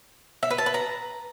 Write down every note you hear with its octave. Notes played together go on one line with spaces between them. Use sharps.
E5
B4
A5
B4
A#5